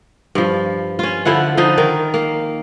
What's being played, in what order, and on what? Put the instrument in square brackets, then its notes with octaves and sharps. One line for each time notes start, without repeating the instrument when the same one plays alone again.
[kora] G2 F3
C#4 F4
D3 F3 E4 F#5
D3 F3 D#4
D#3 A#4
A#3